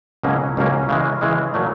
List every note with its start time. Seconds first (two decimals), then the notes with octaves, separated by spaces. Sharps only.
0.23 C#2 B2 F#3 A#3 C#4
0.57 C#2 B2 F#3 A#3 C#4
0.89 C#3 E3 G#3
1.21 C#3 E3 G#3
1.54 A#2 F#3 A3